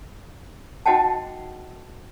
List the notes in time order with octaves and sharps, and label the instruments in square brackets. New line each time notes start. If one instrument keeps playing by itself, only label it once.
[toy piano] D#4 F#4 D#5 F#5 G5 A5